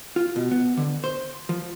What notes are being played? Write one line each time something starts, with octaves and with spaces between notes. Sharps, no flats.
F4
B2
B3
D3
C5
F3